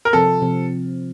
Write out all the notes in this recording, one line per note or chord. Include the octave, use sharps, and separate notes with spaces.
A#4
C3 F3 C4 A4
C3 F3 C4